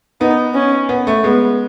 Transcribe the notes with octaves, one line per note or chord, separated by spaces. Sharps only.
B3 D#4
C#4
B3
A3
G#3 B3